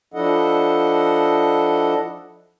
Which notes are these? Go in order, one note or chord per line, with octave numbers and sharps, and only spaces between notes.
F3 D4 E4 A4 D#5 F#5